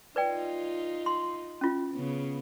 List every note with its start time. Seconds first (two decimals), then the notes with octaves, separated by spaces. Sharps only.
0.16 D#4 F4 B4 D5 G5
1.06 C6
1.61 C#4 F4
1.92 C#3 B3